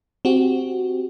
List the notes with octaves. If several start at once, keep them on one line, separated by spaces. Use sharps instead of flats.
C4 F#4 G4